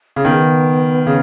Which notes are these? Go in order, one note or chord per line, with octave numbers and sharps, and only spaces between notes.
C#3
D#3 B3
C#3